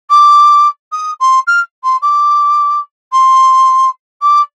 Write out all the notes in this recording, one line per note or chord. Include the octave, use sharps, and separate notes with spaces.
D6
D#6
C6
F6
C6
D6
C6
D6